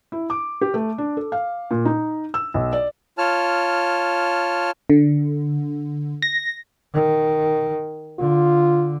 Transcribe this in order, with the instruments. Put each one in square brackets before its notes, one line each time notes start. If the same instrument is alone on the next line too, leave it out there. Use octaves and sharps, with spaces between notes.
[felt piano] E4
D6
G4
A3
D4
A4
F5
A#2
D#4
E6
B1
D5
[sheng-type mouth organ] F4 C#5 A5 F6
[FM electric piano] D3
A#6
[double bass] D#3
[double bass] D3 [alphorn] F4